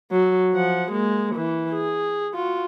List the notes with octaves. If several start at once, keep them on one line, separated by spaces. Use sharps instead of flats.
F#3
F3 F#5
G#3 A#3
E3
G#4
F4 F#4